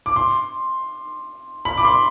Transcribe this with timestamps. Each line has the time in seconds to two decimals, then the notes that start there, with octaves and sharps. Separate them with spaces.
0.06 D6
0.16 C6
1.65 B5
1.77 D6
1.85 C6